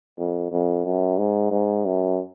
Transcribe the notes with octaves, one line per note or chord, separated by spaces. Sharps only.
F2
F2
F#2
G#2
G#2
F#2